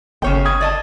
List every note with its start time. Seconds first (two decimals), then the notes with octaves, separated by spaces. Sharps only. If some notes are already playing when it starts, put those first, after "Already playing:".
0.22 G1 C#3 C#5 G5
0.45 D#6 G#6
0.61 D5 D#5 A5